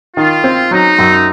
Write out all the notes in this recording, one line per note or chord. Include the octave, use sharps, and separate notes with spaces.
D#3 F4
C4
F#3 D#4
F#2